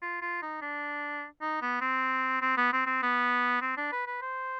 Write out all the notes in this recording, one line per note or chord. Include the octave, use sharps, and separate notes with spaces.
F4
F4
D#4
D4
D#4
B3
C4
C4
B3
C4
C4
B3
C4
D4
B4
B4
C5